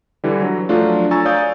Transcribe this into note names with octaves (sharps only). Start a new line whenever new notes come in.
D3 E3 G3
F#3
F3 F#3 A3 D4 F4
G#5 A#5 C#6 E6 A6
C#5 D5 F5 D#6 G6 A6